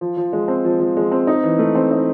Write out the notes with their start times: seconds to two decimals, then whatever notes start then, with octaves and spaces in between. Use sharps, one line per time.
0.01 F3
0.17 F3
0.33 G#3
0.48 C4
0.64 F3
0.80 F3
0.97 G#3
1.12 C4
1.27 D#4
1.44 E3
1.59 A3
1.75 C4
1.91 D#4